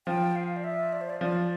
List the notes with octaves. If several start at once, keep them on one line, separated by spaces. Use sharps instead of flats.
F3 G5
F5
D5
E5
D5
C5
D5
F3 D5